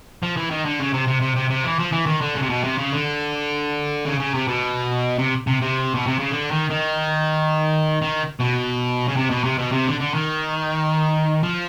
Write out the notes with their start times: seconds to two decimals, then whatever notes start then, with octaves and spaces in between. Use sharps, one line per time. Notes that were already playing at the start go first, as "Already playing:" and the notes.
0.23 F3
0.37 E3
0.51 D#3
0.65 D3
0.80 C#3
0.94 C3
1.07 C3
1.21 C3
1.36 C3
1.50 C3
1.64 E3
1.79 F3
1.92 E3
2.06 D#3
2.21 D3
2.35 C#3
2.43 C3
2.50 B2
2.64 C3
2.78 C#3
2.92 D3
4.05 C#3
4.20 C#3
4.34 C3
4.48 B2
5.19 C3
5.47 C3
5.62 C3
5.95 B2
6.08 C3
6.20 C#3
6.32 D3
6.52 D#3
6.70 D#3
8.02 D#3
8.40 B2
9.08 C#3
9.16 C3
9.30 B2
9.44 C3
9.59 B2
9.72 C3
9.87 D3
10.01 D3
10.15 D#3
11.43 F3